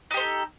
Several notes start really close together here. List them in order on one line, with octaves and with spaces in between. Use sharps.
D#4 G4 C5 A4